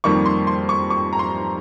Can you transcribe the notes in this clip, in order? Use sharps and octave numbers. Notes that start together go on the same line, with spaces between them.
F2 D#3 G3 A#3 C#6
C6
C6
C#6
C#6
A#5
C6